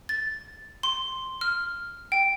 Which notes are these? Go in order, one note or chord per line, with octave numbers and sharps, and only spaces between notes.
A6
C6
F6
G5